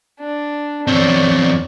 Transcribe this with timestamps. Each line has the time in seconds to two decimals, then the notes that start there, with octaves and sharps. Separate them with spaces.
0.20 D4
0.88 E2 C4 C#5 D5